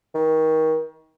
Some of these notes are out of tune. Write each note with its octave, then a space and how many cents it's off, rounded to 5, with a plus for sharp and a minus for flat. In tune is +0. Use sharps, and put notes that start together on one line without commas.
D#3 +30